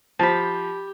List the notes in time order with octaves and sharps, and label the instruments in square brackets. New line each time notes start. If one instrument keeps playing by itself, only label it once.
[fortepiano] F3 [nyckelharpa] G4 [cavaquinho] A5 B5